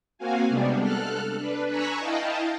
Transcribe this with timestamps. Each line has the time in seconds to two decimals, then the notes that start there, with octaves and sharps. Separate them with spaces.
0.18 A#3 C4 F#4 F5 G#5
0.49 C3 G3 G#3 B3 D4
0.79 A4 F6 F#6
1.38 D4 B4
1.69 G#5 A#5 B5 C#6 E6 F#6
1.99 E4 D#5 F5 G5 A5